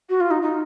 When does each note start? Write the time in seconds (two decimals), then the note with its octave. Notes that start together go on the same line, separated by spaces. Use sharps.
0.09 F#4
0.21 F4
0.31 D#4
0.42 D#4